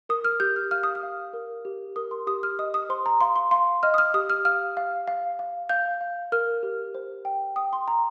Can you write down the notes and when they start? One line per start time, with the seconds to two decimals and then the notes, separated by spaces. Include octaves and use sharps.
0.09 A#4 D#6
0.24 F6
0.40 G4 G6
0.56 F6
0.71 F5 F6
0.83 D#6
0.95 F6
1.03 F5
1.33 A#4
1.65 G4
1.96 A#4 D#6
2.11 C6
2.27 G4 D#6
2.43 F6
2.59 D#5 D#6
2.74 D#6
2.89 C5 C6
3.06 A#5
3.21 F5 C6
3.36 C6
3.51 F5 C6
3.83 D#5 F6
3.94 D#6
3.98 F6
4.14 G4 D#6
4.30 F6
4.45 F5 F6
4.77 F5
5.08 F5
5.39 F5
5.69 F5 G6
6.01 F5
6.32 A#4 F6
6.63 G4
6.95 C5
7.25 G5
7.56 G5 D#6
7.73 C6
7.88 G5 A#5